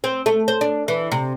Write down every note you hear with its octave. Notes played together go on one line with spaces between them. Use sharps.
C4
A3
C5
D4
E3
C3